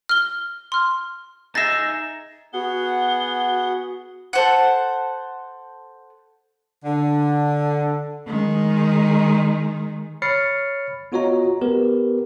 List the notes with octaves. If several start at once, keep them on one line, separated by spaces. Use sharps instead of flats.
F6 G7
C6 F6
D#4 G#4 E5 A6 A#6
B3 F#4 G#4 F#5 G7
A4 C5 F#5
D3
D#3 G#3
C#5 B5 F6 A6 C7 C#7
B3 F4 F#4 C#5 D#5 A#5
B3 G4 A#4 B4